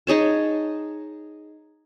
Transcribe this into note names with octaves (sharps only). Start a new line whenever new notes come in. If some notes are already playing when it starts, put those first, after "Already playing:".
D#4 G#4 C#5 A5